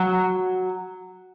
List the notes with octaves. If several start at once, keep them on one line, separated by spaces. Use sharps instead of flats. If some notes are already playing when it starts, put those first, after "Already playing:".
Already playing: F#3